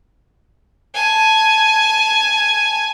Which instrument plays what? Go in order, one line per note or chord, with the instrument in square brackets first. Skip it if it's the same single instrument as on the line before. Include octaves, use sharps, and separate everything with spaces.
[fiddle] G#5 A5